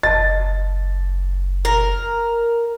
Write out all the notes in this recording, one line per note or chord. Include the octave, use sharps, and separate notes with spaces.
F#1 D#5 A5 A6
A#4